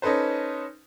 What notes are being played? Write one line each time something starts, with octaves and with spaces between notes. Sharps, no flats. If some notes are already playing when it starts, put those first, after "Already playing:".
C#4 D#4 A4 B4 C5